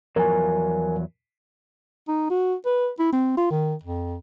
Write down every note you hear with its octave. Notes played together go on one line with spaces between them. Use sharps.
E2 F3 F#3 A#4 G#5
D#4
F#4
B4
E4
C4
F4
D#3
F2